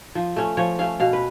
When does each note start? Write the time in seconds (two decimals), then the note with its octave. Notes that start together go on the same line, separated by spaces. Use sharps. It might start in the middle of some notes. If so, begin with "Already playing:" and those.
0.15 F3
0.36 A3 C#4
0.57 F3 C#5
0.79 A3 C#4 F5
1.00 B2 F5
1.13 B4